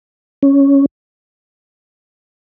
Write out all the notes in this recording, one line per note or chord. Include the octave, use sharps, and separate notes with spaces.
C#4